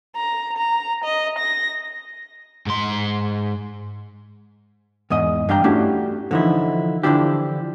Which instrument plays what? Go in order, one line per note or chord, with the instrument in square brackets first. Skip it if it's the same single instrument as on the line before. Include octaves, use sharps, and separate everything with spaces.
[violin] A#5
A#5
D#5
A#6
[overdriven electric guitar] G#2 C6
[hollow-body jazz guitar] E2 G#2 D#5
G2 D4 F5 G5 A#5
A3 C#4 D4 E4 F#4 G4
D3 E3 F3 D#4 E4
D3 E3 F3 D4 E4 G4